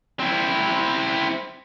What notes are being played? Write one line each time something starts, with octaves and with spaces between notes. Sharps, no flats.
C4 E4